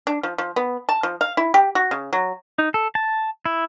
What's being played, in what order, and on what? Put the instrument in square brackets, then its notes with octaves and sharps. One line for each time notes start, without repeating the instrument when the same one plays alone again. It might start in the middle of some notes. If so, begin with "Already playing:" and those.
[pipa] D4
F3
F3
B3
A5
F3
F5
E4
G4
F#4
C#3
F#3
[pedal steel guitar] D#4
A4
A5
E4